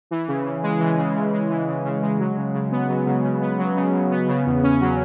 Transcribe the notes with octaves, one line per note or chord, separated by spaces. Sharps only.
E3
C#3
C#3
G#3
E3
C#3
C#3
G#3
E3
C#3
C#3
G#3
F#3
C#3
C#3
B3
F#3
C#3
C#3
B3
F#3
C#3
C#3
B3
C#3
E2
C#4
F#3